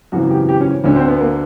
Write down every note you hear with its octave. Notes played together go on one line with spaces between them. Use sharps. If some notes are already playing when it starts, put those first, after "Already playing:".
G#1 F#2 C#3 E3 F#4
G4
G4
C#4
D2 D3 C#4
C4
B3
A#3